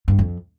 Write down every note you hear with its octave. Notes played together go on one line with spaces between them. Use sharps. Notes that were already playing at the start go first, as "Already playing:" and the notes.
G2
F2